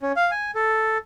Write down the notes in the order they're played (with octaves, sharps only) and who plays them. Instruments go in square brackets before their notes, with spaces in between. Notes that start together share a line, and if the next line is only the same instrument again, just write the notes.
[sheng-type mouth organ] C#4
F5
G#5
A4